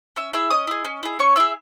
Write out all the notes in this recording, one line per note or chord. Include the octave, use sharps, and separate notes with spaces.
C#4 E5 E6
E4 G#4 E5 E6
C#4 D#5 D#6
E4 G#4
C#4
E4 G#4
C#4 C#5 C#6
E4 G#4 E5 E6